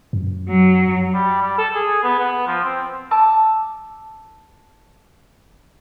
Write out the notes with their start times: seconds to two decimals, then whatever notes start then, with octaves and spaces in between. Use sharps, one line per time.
0.13 F#2
0.49 F#3
1.14 G3
1.43 G3
1.58 A4
1.75 G#4
2.04 B3
2.19 B3
2.47 F3
2.64 C4
3.11 A5 D6 E6